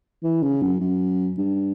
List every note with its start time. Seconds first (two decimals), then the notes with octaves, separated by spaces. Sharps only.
0.23 E3
0.42 C#3
0.62 F#2
0.80 F#2
1.38 G2